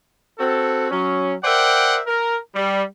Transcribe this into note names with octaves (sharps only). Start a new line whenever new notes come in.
C4 F#4 A4
F#3 C#4
A#4 C5 D5 E5 F#5 G5
A#4
G3